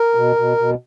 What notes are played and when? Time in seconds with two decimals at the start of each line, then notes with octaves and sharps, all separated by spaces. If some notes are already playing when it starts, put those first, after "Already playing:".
Already playing: A#4
0.15 B2
0.36 B2
0.57 B2